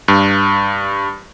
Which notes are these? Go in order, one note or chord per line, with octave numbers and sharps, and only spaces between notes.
G2